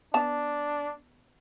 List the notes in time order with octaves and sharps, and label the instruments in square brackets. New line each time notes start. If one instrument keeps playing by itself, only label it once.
[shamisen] B3 A5 [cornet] D4